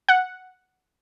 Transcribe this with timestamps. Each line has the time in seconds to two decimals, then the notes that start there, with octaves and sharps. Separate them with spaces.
0.09 F#5